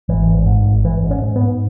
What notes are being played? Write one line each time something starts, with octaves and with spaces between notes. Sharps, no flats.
G#1 E3
G#1
G#2
G#1
G#1 E3
G#2
C#4
G#2
B3
G#2